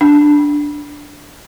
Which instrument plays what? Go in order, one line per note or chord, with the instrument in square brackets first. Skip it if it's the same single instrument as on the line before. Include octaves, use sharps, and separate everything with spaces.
[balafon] D4